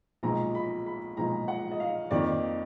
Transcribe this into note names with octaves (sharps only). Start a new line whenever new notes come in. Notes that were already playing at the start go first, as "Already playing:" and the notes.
B1 A#2 F3 G#3 A#5
B5
B5
B1 A#2 F3 G#3 A#5
F#5
D#5
F5
F2 D#3 A#3 D5